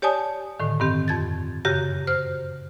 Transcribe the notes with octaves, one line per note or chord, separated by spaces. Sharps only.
G4 C#5 D5 G#5 A5 D#6
A2 D3 D#3
G2 D#3 C4 G4
F2 G#6 A6
F#2 C#3 F#4 G4 A#6
C5 F6